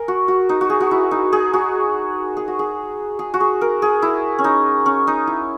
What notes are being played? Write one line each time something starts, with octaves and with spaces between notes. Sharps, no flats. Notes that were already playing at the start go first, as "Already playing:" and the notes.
Already playing: G#4 A#4
F#4
F#4
D#4
F#4
G#4
F#4
E4
D#4
G#4
F#4
G#4
F#4
G#4
G#4
F#4
G#4
A#4
G#4
E4
C#4
D#4
C#4
D#4
E4